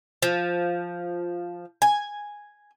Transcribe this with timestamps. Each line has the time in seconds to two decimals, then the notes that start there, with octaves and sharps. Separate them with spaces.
0.22 F3
1.82 G#5